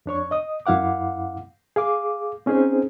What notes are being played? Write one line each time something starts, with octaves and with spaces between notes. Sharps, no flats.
F2 D4 C#5 C#6
D#5 D#6
F#2 E4 F5 F#5 D6
G#4 F5 D6
C4 C#4 D#4 G#4 C5